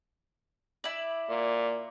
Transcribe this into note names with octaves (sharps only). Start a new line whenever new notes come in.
E4 D5
A#2